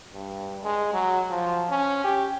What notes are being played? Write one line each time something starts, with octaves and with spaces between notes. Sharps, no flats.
G2
G#3
F#3
F3
C#4
G4